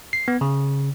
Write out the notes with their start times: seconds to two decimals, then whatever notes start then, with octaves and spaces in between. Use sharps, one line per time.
0.13 C7
0.28 B3
0.41 C#3